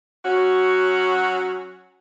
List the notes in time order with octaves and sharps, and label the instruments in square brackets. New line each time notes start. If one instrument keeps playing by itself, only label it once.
[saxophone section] F#3 C#4 F#4